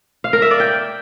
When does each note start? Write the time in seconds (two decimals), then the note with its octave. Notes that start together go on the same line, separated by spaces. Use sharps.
0.24 F5
0.33 A#4
0.42 E5
0.51 D5
0.60 G5